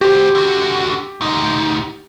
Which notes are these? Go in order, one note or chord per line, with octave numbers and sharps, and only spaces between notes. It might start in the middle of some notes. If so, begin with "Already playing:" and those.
F#4 G4 C5
D3 F#4
D2 D#4